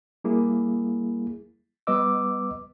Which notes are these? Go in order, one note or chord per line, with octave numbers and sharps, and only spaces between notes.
G3 A#3 E4 G#4
G3 B3 B4 D#5 D6 E6